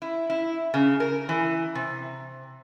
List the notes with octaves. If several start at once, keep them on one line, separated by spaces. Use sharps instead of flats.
E4
E4
C#3
A#4
E3
C3